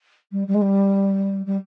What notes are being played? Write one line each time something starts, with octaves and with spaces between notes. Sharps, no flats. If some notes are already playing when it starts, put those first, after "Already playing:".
G3
G3
G#3
G3
G3